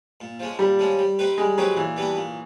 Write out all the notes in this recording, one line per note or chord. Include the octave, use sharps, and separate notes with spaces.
A#2
F3 G#3 C#4
A#2 G3
F3 G#3 C#4
G3
C4 D#4 G4 B4
G3 G#3
F#3 C4 D#4 G4 B4
A#2 E3
G3 B3 D4 G4
A#2